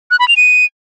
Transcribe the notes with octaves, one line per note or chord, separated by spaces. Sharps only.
F#6
B5
F7
D#7